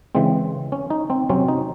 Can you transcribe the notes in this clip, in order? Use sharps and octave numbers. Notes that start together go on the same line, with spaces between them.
C#3 E3 G#3 C4
C#4
D#4
C4
C3 F#3 C4 C#4
D#4